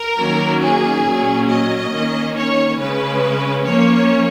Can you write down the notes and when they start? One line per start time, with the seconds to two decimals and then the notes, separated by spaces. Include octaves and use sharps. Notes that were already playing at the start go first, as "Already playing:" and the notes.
Already playing: A#4
0.18 D#3 F#3 A#3 C#4
0.62 G#4
1.05 A#2 F#3 C#4
1.49 D#5
1.92 D#3 A#3 C#4
2.35 C#5
2.78 C#3 G#3 C#4 B4
3.65 F3 A#3 C#4 C#5